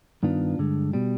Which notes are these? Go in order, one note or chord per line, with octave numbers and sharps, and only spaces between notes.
G2 D#3 B3 D4 F4
G2 D3 G#3
B2 G3